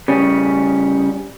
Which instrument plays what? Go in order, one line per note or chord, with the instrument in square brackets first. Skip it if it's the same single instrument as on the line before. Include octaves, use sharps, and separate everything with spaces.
[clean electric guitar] C#3 G3 C#4